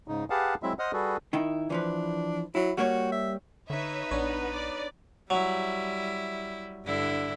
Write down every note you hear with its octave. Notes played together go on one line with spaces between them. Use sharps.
G#2 C#3 D#4
G4 G#4 B4 F5 F#5 A5
F#3 G#3 C4 E4 E5
C5 D#5 F#5 D#6 F6
G3 F#4 G#4 A4 B4
D#3 D#4 E4
E3 F3 D4 B4
F#3 E4
G3 A#3 F#4 C#5
E5
D3 D#4 B4 C#5 E5
A#1 B3 D4 C#5
D5
F#3 G3 E4
G2 D3 E4